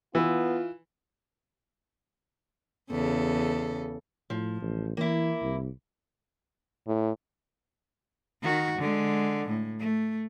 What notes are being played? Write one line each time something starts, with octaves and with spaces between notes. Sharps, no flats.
E3 B3 F4
E2 C#3 A4
A2 F3
A1
E3 A#3 E4
C2
A2
D#3 F#4
D3 G#3
A2
A3